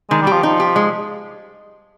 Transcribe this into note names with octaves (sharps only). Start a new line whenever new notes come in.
D#3 G#3
G3
G4
F3
F3 D#4
G4
G#3